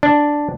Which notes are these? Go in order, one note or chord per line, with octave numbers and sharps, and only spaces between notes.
D4